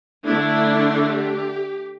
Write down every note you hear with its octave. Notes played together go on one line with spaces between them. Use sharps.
D3 A3 D4 E4
G4